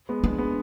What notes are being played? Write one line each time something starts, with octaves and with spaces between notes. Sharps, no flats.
G#3 B3
G#3 B3 D4
G#3 B3